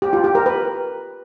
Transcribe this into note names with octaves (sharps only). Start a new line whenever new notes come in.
G4
F4
G4
A#4
B4